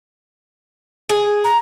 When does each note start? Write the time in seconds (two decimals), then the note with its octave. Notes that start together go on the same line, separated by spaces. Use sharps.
1.09 G#4
1.44 A#5